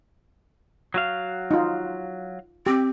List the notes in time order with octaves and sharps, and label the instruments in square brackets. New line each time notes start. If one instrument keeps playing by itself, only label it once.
[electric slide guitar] F#3 F#4 F5
[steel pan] D#4 F4
[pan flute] C4 [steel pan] G4